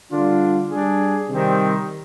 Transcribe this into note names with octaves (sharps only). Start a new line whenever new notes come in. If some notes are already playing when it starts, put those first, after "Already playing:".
D3 G3 D4 F4
G3 D4 G#4
C3 D#3 G3 C4